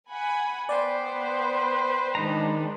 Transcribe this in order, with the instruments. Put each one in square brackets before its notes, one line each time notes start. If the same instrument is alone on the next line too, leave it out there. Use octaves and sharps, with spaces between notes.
[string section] F#5 G#5 B5
[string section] B3 [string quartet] B4 C5 G5 [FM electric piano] D5
[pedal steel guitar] D#3 D#4 A#5 [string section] G#3 D4